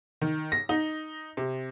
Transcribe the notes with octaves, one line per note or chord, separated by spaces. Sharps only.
D#3
A#6
D#4
C3